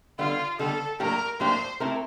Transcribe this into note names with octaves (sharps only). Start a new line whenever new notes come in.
D3 G3 B3 F4
D3 G3 B3 A4
A2 F#3 A#3 D4 G4 A#4
A2 F#3 A#3 D4 G4 C5
A3 C4 E4 G4 A#4